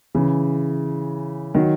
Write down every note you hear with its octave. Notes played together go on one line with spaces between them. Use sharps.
C#3 E3
D#3 F#3